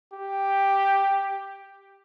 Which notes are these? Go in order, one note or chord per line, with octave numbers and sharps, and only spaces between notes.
G4